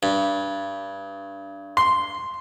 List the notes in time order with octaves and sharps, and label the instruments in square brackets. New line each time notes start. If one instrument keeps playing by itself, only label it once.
[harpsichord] G2
[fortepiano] C6